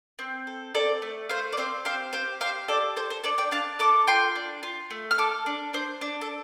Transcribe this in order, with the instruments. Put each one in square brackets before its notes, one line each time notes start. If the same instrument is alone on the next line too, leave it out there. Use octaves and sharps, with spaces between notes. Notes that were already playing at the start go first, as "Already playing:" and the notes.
[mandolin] C4
A4
C4 A4 D5
A3
A3 C5 F5
D5
C4 C5 F5
G4 C5 F5
G4 C5 F5
G4 C5 F5
G4 A4 D5
A4 C5
C5
D4 A4 D5
D5 G5
D4 F5 A5
A4 A5 D6
F4 G5 C6
D4
F4
A3
F6
A4 A5 D6
D4
D4 C5
D4
A4